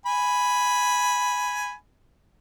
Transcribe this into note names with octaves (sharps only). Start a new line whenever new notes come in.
G#5 B5